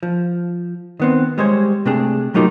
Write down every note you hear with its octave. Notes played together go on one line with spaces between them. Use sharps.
F3
D#3 B3 C4
G3 G#3 C5 C#5
C3 A3 D4 G#4
F#3 A3 A#3 D#4 F4 G4